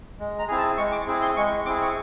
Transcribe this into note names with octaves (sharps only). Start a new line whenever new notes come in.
G#3
A#5
C4 E4 G#4
A5
G#3 C#6
D6
C4 E4 G#4
C6
G#3 C#6
C4 E4 G#4 D6
C#6